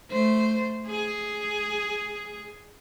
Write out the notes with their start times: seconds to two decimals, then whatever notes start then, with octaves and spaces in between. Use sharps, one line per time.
0.11 A3 C5
0.87 G#4